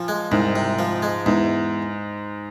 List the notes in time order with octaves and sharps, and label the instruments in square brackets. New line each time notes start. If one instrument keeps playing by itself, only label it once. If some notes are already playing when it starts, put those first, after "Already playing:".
Already playing: [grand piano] A#2 [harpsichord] F3
[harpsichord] G#3
[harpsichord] C2 [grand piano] G#2
[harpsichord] C3
F3
G#3
[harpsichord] E2 [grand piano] G#2